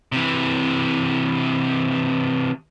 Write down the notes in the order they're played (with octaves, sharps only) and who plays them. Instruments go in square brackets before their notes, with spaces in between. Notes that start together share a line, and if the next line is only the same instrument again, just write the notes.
[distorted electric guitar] C3 E3